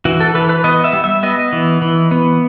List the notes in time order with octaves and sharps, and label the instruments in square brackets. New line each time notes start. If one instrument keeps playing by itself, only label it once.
[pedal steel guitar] E3 F#4
A4
E3 B4
B4
B3 D#5
E5
G3
E5
B3 D#5
E3
E3
B3